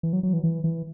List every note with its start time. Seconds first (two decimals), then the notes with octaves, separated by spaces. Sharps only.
0.03 E3
0.13 F#3
0.23 F#3
0.33 E3
0.44 E3
0.64 E3